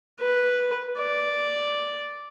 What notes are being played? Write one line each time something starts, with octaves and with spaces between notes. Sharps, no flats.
B4
D5